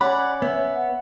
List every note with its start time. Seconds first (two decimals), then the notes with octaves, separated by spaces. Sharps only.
0.01 C#4 C#5 D5 F#5 B5
0.42 B3 E5
0.73 F#5